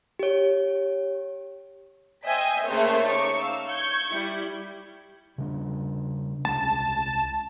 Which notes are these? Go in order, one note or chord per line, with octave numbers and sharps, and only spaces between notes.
G4 C#5
C5 D#5 E5 G5 G#5 B6
C#3 A3 A#3 C5 C#5
D#4 C#5 C#6 D6
F5 E6
C#6 G6 G#6 C#7
G3 E4
C#3 G3 D4
C2 G#3 C#4 A5